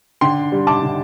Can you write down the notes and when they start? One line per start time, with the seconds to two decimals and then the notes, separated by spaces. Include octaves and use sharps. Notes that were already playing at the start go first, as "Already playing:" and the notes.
0.21 D3 G5 C6
0.52 G3
0.67 A5 D6
0.83 D3